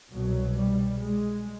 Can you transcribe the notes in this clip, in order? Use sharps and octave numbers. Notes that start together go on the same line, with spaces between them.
C2 B2 F#3
G3
G#3